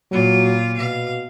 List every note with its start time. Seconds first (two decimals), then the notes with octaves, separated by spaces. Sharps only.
0.11 A#2 F#3 F4
0.77 B2 F5